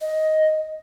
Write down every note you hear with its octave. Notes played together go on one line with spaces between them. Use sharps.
D#5